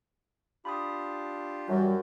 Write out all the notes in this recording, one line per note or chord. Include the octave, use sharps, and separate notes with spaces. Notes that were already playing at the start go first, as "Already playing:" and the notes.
D4 F4 G4 B5 D#6
F#2 E3 G3 F#4